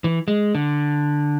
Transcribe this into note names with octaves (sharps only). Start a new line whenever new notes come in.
E3
G#3
D3